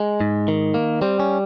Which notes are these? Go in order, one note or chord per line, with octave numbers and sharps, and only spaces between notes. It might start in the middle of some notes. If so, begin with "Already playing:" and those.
Already playing: G#3
G#2
D#3
A#3
G3 C4
C#4